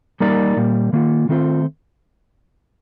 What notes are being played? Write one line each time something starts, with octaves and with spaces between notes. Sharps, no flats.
G3 A#3 D#4 A#4 D5
A#2 G3 A#3
D#3 A#3 F4
D#3 A3 C4 F4 C5